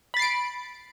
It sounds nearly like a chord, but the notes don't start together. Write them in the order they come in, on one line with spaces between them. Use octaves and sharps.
B5 A6 C7 D7